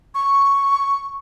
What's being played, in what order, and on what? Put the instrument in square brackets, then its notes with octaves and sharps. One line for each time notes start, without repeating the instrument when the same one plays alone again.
[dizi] C#6